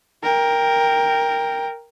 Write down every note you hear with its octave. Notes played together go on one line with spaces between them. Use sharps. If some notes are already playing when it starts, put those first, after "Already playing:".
A#4 G5